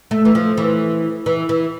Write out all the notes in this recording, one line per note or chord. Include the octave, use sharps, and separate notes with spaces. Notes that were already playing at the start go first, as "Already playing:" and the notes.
A3
E3
F3
E3
E3
E3